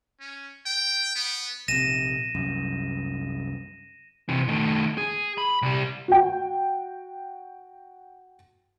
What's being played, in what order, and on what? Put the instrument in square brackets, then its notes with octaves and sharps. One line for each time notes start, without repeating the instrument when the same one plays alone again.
[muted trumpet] C#4
G5
B3
[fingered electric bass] A#1 C3 [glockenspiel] A#6 D#7 E7
[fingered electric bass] C2 F#2
[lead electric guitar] C3 E3
D#3 A3
G#4
B5
C2 G3
[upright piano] F#4 G5